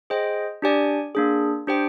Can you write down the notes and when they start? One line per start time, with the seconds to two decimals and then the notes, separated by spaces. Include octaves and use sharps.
0.10 G#4 C5 D#5 G5
0.62 D4 G4 D5 G#5
1.15 A#3 D4 G#4
1.67 D4 G4 C5 G5